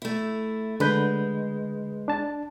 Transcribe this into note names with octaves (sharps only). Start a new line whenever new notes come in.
A3 E4
D3 G#3 B4 G6
D4 A5